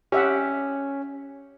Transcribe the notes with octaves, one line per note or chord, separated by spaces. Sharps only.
C#4 G4 E5 F#5